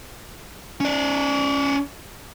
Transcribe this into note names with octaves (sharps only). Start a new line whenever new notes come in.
C#4 D5